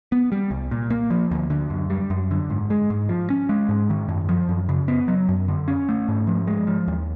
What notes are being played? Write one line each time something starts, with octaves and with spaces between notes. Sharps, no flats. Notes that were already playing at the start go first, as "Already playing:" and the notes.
B3
G3
C2
A#2
A#3
F3
D2
D3
F#2
G3
F#2
D3
G#2
G#3
G#2
F3
C#4
G#3
G#2
D#3
F#2
F3
F#2
C#3
B3
F#3
F#2
D3
C#4
A3
G#2
F3
G#3
F3
D#2